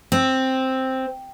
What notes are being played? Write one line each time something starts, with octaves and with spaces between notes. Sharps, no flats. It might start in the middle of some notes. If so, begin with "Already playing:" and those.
C4